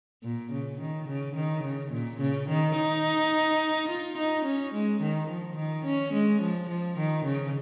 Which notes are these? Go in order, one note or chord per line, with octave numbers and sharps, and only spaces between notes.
A#2
C#3
D#3
C#3
D#3
C#3
A#2
C#3
D#3
D#4
F4
D#4
C#4
G#3
D#3
F3
D#3
C#4
G#3
F3
F3
D#3
C#3